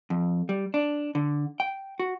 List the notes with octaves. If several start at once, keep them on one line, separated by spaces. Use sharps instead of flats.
F2
G3
D4
D3
G5
F#4